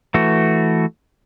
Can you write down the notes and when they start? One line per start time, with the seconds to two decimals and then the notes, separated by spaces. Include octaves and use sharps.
0.14 E3 A3 F#4